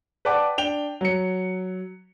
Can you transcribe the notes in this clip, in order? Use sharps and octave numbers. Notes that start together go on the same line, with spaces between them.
B4 D5 F#5 G5 A5 D6
D4 G5 F7 G7
F#3 C#7